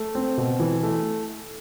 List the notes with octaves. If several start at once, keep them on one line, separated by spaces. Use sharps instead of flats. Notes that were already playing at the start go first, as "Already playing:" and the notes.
Already playing: A3
C4
B2
E3
A3